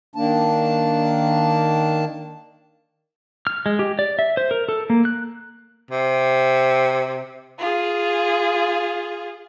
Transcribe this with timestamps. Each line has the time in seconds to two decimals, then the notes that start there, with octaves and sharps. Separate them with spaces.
0.16 D#3 A#3 D4 A5
3.47 F6
3.66 G#3
3.79 G4
3.99 D5
4.19 E5
4.37 C5
4.51 A#4
4.69 A4
4.90 A#3
5.05 F#6
5.91 C3
7.58 F4 G#4